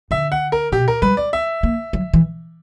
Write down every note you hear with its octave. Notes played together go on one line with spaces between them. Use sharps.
D3 E5
F#5
A#4
B2 G4
A#4
G3 B4
D5
E5
A#3
F#3
E3